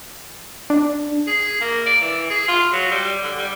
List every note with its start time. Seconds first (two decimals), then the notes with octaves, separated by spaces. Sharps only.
0.70 D4
1.28 G#4
1.61 A#3
1.86 D5
2.01 E3
2.30 G#4
2.48 F4
2.73 F#3
2.92 G3
3.23 D3
3.38 G3